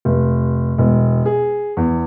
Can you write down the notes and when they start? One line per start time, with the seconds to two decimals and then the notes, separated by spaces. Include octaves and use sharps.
0.05 F1
0.78 E1
1.26 G#4
1.77 E2